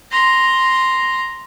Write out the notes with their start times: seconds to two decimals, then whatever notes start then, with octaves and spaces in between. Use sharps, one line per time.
0.11 A#5 C6